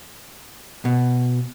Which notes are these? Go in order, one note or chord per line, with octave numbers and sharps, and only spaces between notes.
B2